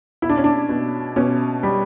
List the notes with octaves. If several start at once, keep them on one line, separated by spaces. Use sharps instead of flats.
B2 E4
D4
C#4
D4
B2
B2 C#4
G3